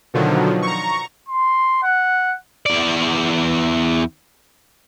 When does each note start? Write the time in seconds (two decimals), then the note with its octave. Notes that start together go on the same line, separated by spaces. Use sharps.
0.14 B2 D3 D#3 F3 F#3
0.62 A#5 C#6
1.28 C6
1.83 F#5
2.66 E2 D5